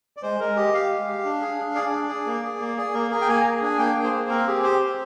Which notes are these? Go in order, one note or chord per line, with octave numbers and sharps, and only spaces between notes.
D5
G#3 C5
G#3 A#4
G4 D#5
G4 F5
G#3
G4
D4
G#4
D4
G#4 D5
D4
G#4
A#3
G#4
A#3
G#4 D5
A#3 A#4
G#4 A#4
G5
A#3 G#5
G#4 A#5
D4 G#5
A#3 G5
G#4
C5
A#3
C4 A#4
G4 G#4
G4 C5
C4